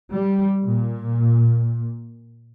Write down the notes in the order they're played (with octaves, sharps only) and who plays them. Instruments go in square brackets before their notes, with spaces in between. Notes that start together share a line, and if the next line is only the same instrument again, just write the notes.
[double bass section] G3
A#2